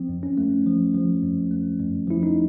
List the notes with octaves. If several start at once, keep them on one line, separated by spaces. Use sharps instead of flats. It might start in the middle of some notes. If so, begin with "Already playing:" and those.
Already playing: F3 C4
F2
C#4
A3
F3
F3
F2
A3
F2
F3 E4
D#4